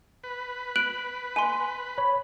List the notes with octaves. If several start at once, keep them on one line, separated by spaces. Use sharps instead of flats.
B4
F#6 D7 F#7
G#5 C6 D#7
C#5 B5